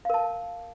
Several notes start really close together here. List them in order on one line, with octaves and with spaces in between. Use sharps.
F5 A#4 A5